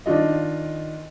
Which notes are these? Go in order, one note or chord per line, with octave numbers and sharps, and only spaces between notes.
D#3 D4 F4 D#5